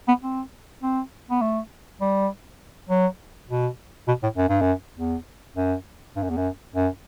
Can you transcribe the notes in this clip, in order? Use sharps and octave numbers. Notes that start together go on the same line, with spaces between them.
B3
C4
C4
B3
A3
G3
F#3
B2
B2
A2
F#2
G2
F#2
E2
F#2
G2
F#2
E2
F#2
F#2